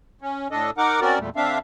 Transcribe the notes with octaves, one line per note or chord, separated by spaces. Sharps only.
C#4
A2 D4 A4 D#5
D#4 A#4 F#5 D6
C4 C#4 F#4 A#4 D5
E2 A#2 G3 A3
D3 C4 D4 E5 F5